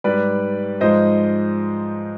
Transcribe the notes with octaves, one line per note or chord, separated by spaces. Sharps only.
G#2 G3 B4 D5
G#2 F3 G#3 C5 D#5